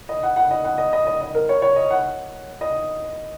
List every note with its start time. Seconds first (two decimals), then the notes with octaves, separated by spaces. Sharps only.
0.09 D#5
0.23 F#5
0.36 F#5
0.51 D#5
0.64 F#5
0.78 D#5
0.93 D#5
1.07 D#5
1.21 D#5
1.35 A#4
1.49 C#5
1.62 C#5
1.76 D#5
1.90 F#5
2.61 D#5